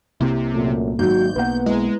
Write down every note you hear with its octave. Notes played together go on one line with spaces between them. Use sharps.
C2 C3 A#3 C4 E4
F#2 A#2 A3
G#1 F#3 A#3 F#4 G6
B1 A#3 B3 B4 F#5
G#3 E4 B4 A#5